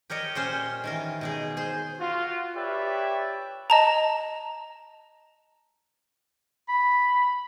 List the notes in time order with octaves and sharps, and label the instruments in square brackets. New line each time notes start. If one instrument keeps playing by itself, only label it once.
[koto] G4 A#4 C#5 D#5
A#2 C#4 C5 C#5
D#3 E3 A#4
B2 D#4 G#4
G#4 C5
[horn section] F4 F#4
G4 B4 C#5 D5 E5 G5
[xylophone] D#5 A5 A#5
[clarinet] B5